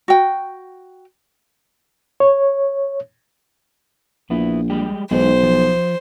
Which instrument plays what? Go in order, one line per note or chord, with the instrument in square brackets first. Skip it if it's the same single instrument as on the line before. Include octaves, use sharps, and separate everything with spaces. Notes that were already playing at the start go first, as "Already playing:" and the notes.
[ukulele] F#4 G5
[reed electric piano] C#5
[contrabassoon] A#1 [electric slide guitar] B3 E4
[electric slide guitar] G3 G#3 G4
[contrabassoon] B1 [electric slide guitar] E3 G#3 D#4 [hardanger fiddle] C5
[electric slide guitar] F3